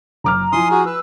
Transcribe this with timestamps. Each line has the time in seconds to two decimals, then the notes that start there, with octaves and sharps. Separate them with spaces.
0.24 F#1 A#5 D6 F6
0.52 F3 E4 G#5 C6 D#6
0.71 F#4 G#4
0.86 B4 E6